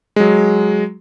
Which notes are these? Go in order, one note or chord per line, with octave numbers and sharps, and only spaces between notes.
F#3 G#3